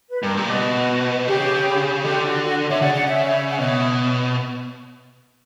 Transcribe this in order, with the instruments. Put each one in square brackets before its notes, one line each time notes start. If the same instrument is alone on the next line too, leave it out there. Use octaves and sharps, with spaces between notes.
[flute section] B4
[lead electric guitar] G2 [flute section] A#4
[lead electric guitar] A#2 [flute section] G4
[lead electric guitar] B2 [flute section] F#4
[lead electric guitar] C#3 [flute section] G4
[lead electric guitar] D3 [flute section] G4
[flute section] F#4
F#4
[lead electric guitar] D3 [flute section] C#5 E5
[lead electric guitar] C#3 [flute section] D5 F#5
[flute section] D5 F#5
C#5 E5
F#5
[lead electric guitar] B2 [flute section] C#5 E5